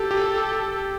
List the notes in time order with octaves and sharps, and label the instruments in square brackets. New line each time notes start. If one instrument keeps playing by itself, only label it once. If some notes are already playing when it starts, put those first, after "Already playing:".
Already playing: [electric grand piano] G4 [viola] A4
[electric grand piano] G4